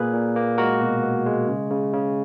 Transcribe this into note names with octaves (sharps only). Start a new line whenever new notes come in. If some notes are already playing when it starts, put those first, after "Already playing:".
Already playing: A#2 A#3 G#4 B4
A#2
A#3
G#3 F#4 A#4
B2
B3
G#3
C#3
C#3
C#3